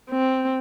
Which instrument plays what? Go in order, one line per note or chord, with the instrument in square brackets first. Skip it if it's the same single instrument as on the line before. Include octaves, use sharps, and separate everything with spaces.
[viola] C4